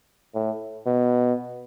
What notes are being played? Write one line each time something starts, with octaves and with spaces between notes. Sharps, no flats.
A2
B2